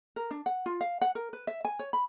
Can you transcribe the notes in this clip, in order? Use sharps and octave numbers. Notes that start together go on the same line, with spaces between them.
A#4
D4
F#5
F4
F5
F#5
A#4
B4
E5
G#5
C#5
B5